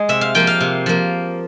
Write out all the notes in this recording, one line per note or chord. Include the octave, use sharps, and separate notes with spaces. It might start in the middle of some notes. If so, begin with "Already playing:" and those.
Already playing: G#3
C3 E5
F5
F3 A#3 G5
F5
C3
F3 A#3